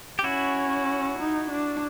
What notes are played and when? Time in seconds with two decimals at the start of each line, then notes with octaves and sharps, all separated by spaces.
0.19 G4
0.24 C#4 E4 F#4
1.19 D#4
1.51 D4